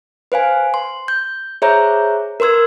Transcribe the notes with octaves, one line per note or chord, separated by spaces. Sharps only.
B4 C5 F5 G#5
C6
G6
G#4 C5 C#5 E5 A#5 G6
A#4 B4 C6 E6 G#6